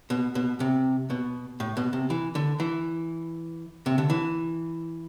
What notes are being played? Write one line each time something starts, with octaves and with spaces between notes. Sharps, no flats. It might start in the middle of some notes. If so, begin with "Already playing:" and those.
B2
B2
C3
B2
A2
B2
C3
E3
D3
E3
C3
D3
E3